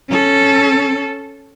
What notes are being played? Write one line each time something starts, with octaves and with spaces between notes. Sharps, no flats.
C#4 A4